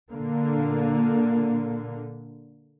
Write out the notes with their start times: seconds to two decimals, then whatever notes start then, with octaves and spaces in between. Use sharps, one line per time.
0.11 A#2 D3 A#3